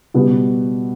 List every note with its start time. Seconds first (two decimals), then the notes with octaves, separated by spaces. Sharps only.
0.14 B2 G3 B3